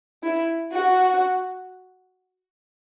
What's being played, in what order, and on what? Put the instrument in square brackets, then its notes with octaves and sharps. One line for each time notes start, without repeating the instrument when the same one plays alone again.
[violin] E4
F#4